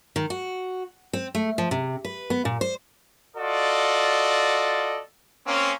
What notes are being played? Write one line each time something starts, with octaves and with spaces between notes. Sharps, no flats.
D#3
F#4
C4
A3
F3
C3
B4
B3
A#2
C5
F4 F#4 A4 D5 D#5
A#3 C4 C#4